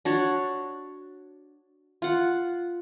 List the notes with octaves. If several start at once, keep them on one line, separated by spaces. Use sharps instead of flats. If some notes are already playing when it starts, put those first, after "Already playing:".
D4 F#4 C#5
F4 F#5